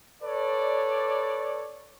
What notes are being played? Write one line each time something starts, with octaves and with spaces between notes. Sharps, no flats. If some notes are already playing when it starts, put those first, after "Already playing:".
A4 B4 C#5 D5